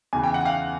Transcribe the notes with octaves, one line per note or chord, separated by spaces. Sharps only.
E2 C#3 E3 G#5
G5
F#5
F5 G5